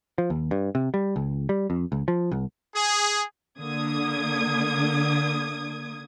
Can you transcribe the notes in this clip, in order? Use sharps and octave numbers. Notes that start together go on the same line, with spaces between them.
F3
D#2
G2
C3
G3
C#2
G3
F2
C#2
F3
C2
G#4
D3 A#3 D#6 G#6